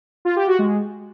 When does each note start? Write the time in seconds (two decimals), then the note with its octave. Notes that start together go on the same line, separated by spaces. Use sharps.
0.25 F4
0.36 G4
0.47 F#4
0.59 G#3